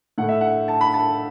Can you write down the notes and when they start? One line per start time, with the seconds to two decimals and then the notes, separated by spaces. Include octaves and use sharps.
0.18 A2 A3 F#5
0.29 E5
0.41 F#5
0.68 A5
0.81 B5
0.94 A5